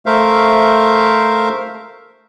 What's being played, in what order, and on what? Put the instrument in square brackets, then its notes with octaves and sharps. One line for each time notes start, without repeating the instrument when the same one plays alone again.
[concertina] A3 A#4 C5 E5 F5